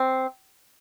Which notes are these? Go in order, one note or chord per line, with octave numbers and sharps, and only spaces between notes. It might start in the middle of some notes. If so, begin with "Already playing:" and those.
Already playing: C4